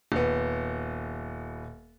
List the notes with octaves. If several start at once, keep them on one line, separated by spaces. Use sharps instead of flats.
D#1 B3